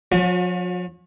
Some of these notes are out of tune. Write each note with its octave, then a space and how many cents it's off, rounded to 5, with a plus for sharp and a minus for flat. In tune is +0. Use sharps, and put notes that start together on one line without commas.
F3 +45 C#4 +15 F#4 -40